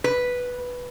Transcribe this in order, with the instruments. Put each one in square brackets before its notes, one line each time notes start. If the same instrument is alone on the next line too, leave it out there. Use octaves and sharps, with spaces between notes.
[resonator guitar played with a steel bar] B4